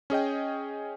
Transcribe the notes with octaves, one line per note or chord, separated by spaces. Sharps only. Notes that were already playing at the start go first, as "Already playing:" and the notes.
C#4 G#4 D#5 G5